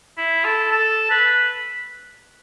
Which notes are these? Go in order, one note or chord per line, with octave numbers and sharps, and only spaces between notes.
E4
A4
A4
B4